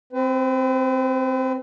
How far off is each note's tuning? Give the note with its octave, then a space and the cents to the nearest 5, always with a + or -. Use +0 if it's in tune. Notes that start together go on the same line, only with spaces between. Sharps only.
C4 +0 B4 +40